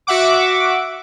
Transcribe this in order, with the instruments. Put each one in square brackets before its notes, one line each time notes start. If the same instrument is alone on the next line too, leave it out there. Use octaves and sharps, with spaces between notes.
[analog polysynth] F#4 E5 F#5 D6